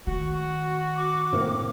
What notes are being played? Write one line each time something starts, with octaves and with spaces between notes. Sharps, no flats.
D#3 A3 F#4
D6
A2 A#3 C4